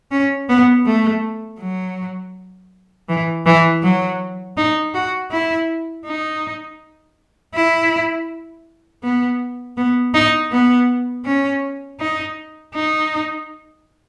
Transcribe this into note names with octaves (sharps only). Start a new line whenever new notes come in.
C#4
B3
A3
F#3
E3
E3
F#3
D#4
F#4
E4
D#4
E4
B3
B3
D#4
B3
C#4
D#4
D#4